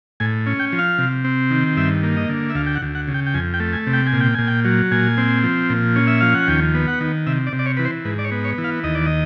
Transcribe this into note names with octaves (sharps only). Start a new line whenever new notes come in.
A2 G#5
C#4
G5
F3
F5
C3
C4
D#3
G2 E5
A#3
D#5
D3
E5
D2 F5
G5
F#5
D2
F#5
C#3
G5
G5
F2 G#5
G5
A3
G#5
C3
G5
G#5
A#2
G5
A#2 G#5
G5
F#3
A#2 G#5
C4
F3
A#2
C#4
E5
F3 F5
F#5
D#2 G5
B3
F#5
D#3
C3 E5
D5
C3
D5
C#5
E3 B4
C5
G#2 B4
D5
C#5
B3
C#5
E3
F5
D#2 D#5
D5
D#5